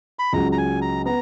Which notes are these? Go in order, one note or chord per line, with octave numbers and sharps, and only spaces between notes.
B5
C#2 C#3 F#3 A#5
A#5
G#5
A#5
B3 A#5